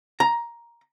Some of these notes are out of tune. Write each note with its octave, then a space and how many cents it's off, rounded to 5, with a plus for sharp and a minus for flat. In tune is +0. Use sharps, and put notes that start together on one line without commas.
A#5 +10